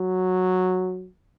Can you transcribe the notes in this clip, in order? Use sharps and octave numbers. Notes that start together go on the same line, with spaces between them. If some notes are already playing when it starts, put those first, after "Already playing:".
Already playing: F#3